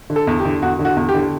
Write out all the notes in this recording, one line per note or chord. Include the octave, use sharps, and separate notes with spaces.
D3
A4
E2
G4
D3
E2 F#4
D3
F#4
E2
G4
D3